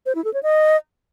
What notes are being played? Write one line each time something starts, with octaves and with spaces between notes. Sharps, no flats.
C5
E4
A4
C#5
D#5